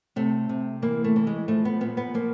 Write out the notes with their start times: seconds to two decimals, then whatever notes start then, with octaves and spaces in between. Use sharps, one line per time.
0.16 C3 A3
0.49 C3
0.82 E3 A#3
1.04 A3
1.16 E3
1.27 G#3
1.48 F3 A3
1.65 B3
1.81 A#2 B3
1.97 B3
2.14 F3 A#3